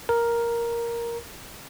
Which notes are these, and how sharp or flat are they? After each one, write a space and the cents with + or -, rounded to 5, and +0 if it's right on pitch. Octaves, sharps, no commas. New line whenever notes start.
A#4 +5